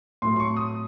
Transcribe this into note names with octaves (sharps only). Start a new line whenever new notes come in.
A2 F#3 A3 C6
C6
C#6
D#6